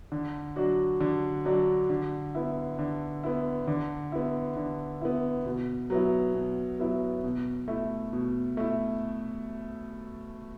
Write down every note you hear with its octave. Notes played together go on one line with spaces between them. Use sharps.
D3
F#3 D4 F#4
D3
F#3 D4 F#4
D3
B3 E4
D3
B3 E4
D3
B3 E4
D3
B3 E4
B2
F#3 B3 E4
B2
F#3 B3 E4
B2
A3 E4
B2
A3 E4